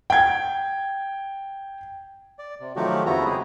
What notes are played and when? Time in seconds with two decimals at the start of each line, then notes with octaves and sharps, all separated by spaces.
0.10 G5 G#6
2.39 D5
2.60 C3
2.76 D#3 F3 F#3 A3 F#4 G4
3.06 F2 C#3 B3 E4 F#4 A#5
3.26 G#3 G4 G#4